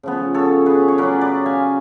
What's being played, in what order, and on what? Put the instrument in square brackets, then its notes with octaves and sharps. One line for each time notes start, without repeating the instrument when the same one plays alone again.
[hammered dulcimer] C#3 F3 B3
A4 C#5
G#4 B4
C#5
C#3 F#3 C#4 B4 D5
B4 D5
F5 G#5